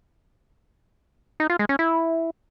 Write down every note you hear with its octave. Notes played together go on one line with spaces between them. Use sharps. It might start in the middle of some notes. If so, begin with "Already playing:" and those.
D#4
F4
G#3
C#4
E4